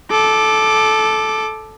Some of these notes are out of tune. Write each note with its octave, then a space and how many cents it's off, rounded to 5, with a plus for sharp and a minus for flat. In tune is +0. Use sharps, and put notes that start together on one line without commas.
A4 -15 D6 +15